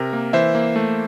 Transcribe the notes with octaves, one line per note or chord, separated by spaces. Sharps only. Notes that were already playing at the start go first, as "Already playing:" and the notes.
Already playing: C3 A#4
A#3
E3 C5 E5
A#3
A3